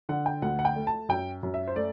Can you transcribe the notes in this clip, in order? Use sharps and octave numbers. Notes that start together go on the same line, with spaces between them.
D3 F#5
G5
D2 F#5
F#5
G5
A3
A5
F#2 G5
F#2
E5
C5
A3 D5